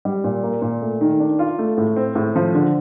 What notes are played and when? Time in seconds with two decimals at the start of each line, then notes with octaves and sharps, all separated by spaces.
0.05 G3
0.24 A#2
0.43 A#3
0.62 A#2
0.82 A3
1.01 D#3
1.20 D4
1.39 F4
1.59 A3
1.77 A2
1.96 C4
2.15 A2
2.36 F3
2.55 D3